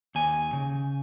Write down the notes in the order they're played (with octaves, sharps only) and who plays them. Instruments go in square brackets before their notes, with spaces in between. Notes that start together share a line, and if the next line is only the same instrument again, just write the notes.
[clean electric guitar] D#2 G#5
C#3